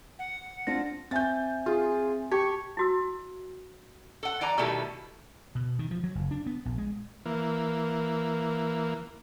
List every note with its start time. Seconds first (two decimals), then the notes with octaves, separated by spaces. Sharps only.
0.19 F#5
0.67 C4 D4 F4 A#6
1.11 C4 E5 G#5 G6 A6
1.66 F4 G#4
2.31 G4 A5 C#6 G#6
2.77 E4 F#4 E6
4.23 A4 F#5
4.41 E3 D5 G#5 A#5
4.58 B2 D#3 G3 A3 E4 A4
5.55 B2
5.79 D#3
5.91 F3
6.04 F#3
6.15 F#1
6.31 D4
6.46 B3
6.65 A#1
6.78 G#3
7.25 E3 A#3